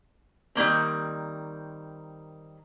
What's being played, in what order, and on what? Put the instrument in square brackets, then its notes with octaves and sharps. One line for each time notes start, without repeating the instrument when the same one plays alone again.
[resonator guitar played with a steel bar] D#3 G3 A#3 C4